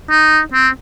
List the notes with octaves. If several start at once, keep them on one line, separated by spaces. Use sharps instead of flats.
D#4
C4